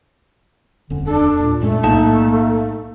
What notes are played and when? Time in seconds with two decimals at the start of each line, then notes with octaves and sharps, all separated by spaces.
0.90 D#1 F2 D3 C#4
1.07 D4 A4
1.39 D#2 A#2
1.62 F#2 G#3 A3 C#4
1.83 B1 A2 A#3 D#4 A5